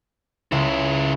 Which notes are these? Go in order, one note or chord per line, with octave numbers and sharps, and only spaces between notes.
C#2 C#3 G#3 E4